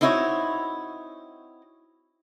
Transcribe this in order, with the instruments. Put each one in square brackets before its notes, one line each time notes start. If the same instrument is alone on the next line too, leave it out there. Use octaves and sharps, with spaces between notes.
[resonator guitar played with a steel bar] C4 D#4 E4 F#4 C#5